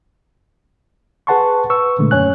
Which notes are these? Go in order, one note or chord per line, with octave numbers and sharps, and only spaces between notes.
G#4 B4 F#5 A5 C6 C#6
B4 C#6 E6
A#2 D3 G#3 A3
F#2 C#4 C#5 G#5 F#6